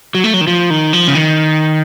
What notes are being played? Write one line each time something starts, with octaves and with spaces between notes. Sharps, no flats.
F#3
A3
F#3
D#3
F3
D#3
F3
C#3
D#3